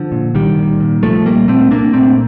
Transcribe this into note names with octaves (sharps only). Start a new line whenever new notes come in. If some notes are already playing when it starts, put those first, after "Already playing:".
Already playing: D3 F3
A#2
C2 D#3 G3
A#2
A#2
C2 F3 A3
A#2 G3 A#3
A#2 A3 C4
C2 A#3 D4
A#2 A3 C4